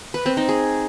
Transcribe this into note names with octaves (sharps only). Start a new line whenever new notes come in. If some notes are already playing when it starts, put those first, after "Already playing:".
B4
C4
D#4
G#4